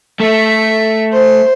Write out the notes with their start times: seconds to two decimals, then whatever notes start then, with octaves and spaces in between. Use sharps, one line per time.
0.20 A3 E5
1.13 C5